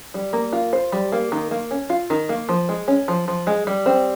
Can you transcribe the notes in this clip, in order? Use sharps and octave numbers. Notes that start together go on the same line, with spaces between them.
G3
A#3
F4
C5
G3
A#3
D#3
A#3
C#4
F4
D#3
A#3
F3
G#3
C#4
F3
F3
G#3
G3
C4